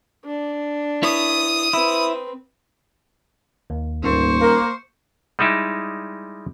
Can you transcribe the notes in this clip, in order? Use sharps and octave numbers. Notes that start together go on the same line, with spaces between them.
D4
E4 B4 C#5 D#6
C4 E4 B4
D#2
D#1 D2 G#2 A#3 C5 C#6
A#3 A#5
G3 G#3 D#4 E4 G4